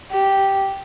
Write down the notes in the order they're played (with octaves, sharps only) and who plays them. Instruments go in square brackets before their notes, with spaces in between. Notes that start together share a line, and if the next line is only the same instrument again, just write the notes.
[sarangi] G4